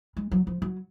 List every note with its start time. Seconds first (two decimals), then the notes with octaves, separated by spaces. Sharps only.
0.17 G#3
0.32 F#3
0.47 F3
0.62 F#3